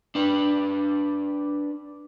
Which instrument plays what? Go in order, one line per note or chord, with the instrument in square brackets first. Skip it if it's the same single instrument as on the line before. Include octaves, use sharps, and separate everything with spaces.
[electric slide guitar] D4 B4